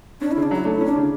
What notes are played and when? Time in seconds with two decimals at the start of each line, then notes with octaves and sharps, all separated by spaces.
0.21 C#4 D4
0.32 C#3 E4
0.43 D4
0.51 F#3 E4
0.64 A3 D4
0.75 E4
0.81 C#4
0.86 D4
0.96 C#3